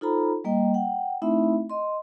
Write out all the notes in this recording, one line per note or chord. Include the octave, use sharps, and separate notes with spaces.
D#4 F4 A4 C5 A#5 B5
G3 A#3 D#5 G5
F#5 G5
A3 C4 D#4 E4 E5 B5
D#5 C6